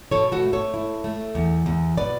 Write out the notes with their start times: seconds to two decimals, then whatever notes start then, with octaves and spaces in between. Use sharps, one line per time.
0.11 B2 A4 C#5
0.32 F#4 A4
0.43 A3
0.53 A4 C#5
0.74 E4
1.04 A3
1.35 E2
1.66 E2
1.97 B2 B4 D5